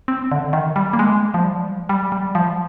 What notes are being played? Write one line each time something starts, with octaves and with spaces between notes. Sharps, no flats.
C4
D3
D#3
G3
A#3
G#3
F3
G3
G3
G3
F3